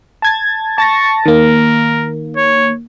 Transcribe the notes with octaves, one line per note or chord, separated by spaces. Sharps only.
A5 G#6 A6
A5 C#6 A6 A#6
D#3 A#3 A#4
C#5